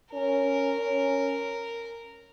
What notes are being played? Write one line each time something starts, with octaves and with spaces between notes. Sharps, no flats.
C#4 A#4
C#4